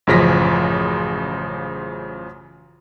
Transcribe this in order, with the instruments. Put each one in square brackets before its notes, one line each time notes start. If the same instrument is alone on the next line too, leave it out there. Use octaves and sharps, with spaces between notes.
[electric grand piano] A1 F#2 C#3 F3 A#6 B6